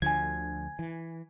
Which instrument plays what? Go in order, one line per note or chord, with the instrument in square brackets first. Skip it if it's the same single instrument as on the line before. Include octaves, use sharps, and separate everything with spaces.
[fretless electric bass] D2 D3 F3 [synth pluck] G#5 G#6
[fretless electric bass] E3